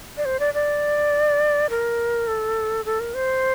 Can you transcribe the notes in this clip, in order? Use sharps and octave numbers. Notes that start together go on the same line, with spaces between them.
D5
C5
D5
D5
A#4
A4
A4
A#4
C5